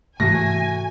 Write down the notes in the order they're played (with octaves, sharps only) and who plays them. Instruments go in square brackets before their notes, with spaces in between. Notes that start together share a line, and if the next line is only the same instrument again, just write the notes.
[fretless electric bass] G#2 C3 E3 [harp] A3 F#4 [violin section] G#5 [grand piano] A#6